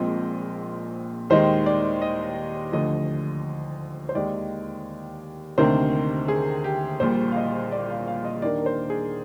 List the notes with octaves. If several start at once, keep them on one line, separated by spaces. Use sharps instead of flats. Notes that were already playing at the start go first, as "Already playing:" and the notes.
Already playing: A#1 A#2 F3 G#3 C4 D#5
D#2 D#3 G#3 D#4 C5
D5
D#5
D2 D3 F3 D#5
C5
D#2 D#3 G#3 D5
D2 C3 D#3 A#3 D4 C5
G#4
G4
A#1 A#2 G3 C5
F5
D#5
D5
F5
F5
D#5
D#2 D#3 A#3 D4 D5
A#4
C5
G#4